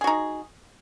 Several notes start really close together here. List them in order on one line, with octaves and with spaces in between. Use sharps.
G#4 F#4 D#4